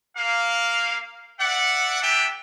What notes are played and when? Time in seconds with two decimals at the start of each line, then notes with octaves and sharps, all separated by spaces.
0.16 A#3 F5
1.39 D5 E5 F#5
2.01 B3 D4 G4 E5 G5